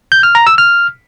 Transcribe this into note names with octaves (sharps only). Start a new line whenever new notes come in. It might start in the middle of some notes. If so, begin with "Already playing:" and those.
G6
F6
A#5
E6
F6